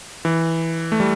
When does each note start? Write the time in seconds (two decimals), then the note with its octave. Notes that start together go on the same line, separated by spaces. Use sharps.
0.25 E3
0.92 A3
1.00 G3